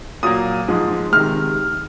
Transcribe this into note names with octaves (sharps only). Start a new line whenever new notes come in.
A#2 F#3 A#3 D#6
G#2 F3 G#3
C3 D#3 G#3 F6